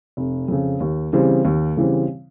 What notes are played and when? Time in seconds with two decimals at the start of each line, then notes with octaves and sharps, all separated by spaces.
0.17 F1
0.48 F2 C#3
0.80 D#2
1.13 C#3 E3 G3 C4
1.45 D#2
1.77 C#3 E3 G3 C4